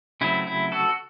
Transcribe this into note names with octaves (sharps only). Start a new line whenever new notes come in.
C#3 F#3 A3 C4 E4
E4
F#4 A4